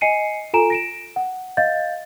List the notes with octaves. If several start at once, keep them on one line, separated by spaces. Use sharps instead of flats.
D#5 G#5 C7 C#7 D#7
F4 A4 G#5 A#5 D7 E7
A#6 D7 E7
F#5
D#5 F5 G6 A6